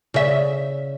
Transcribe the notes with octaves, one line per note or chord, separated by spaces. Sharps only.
C#3 E5